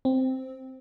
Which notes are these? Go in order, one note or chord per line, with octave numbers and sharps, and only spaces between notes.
C4